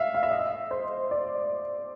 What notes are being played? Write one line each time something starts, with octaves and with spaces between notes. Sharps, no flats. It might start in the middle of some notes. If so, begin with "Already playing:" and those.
Already playing: E5 F5
F5
E5
D#5
C5
D5